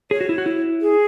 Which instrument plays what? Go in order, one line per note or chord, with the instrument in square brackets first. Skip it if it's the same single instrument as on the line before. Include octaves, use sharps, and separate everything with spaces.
[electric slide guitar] G#4 [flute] C#5
[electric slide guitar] F#4
E4
F#4
E4
[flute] G#4